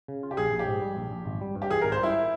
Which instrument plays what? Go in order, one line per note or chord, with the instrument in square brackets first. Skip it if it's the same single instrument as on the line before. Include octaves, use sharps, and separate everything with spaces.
[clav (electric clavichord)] C#3
F4
[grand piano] G4
[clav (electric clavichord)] A#1 [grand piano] G#4
[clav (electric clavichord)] A#1
[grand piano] G4
[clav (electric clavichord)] G#2
G3
A#1
A#1
G#1
G3
G2
[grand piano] G4
[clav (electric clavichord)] E3 [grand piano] G#4
[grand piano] A#4
[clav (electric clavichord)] G#1
[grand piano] C5
[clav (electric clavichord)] G3 [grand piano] E4